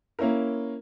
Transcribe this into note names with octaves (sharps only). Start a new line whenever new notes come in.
A#3 C#4 E4 A#4